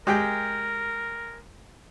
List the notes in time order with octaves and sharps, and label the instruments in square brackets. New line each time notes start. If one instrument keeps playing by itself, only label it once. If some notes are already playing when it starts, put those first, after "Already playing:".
[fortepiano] G#3 G4 G5 [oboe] A#4